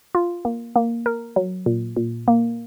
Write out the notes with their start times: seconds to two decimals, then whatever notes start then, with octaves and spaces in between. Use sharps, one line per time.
0.15 F4
0.45 A#3
0.76 A#3
1.06 A#4
1.36 F#3
1.66 A#2
1.97 A#2
2.28 A#3